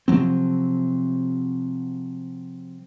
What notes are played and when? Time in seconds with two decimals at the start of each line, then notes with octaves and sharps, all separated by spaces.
0.08 C3 F3 F#3 C4